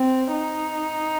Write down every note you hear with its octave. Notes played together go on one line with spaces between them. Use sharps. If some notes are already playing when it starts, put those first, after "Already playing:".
Already playing: C4
D#4